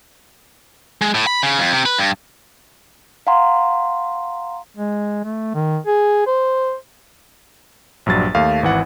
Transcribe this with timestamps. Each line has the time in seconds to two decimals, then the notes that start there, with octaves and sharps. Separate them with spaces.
1.02 G#3
1.15 A2
1.27 B5
1.43 C#3
1.59 F2
1.73 C3
1.86 B4
1.98 G2
3.27 F5 F#5 G#5 A#5 C6
4.76 G#3
5.25 A3
5.55 D#3
5.87 G#4
6.27 C5
8.06 A#1 G2 F#3 A6
8.35 D#2 A3 F5
8.63 G#1 E3 F#5